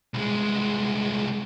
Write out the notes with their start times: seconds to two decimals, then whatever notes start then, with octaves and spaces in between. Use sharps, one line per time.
0.14 C2 G#3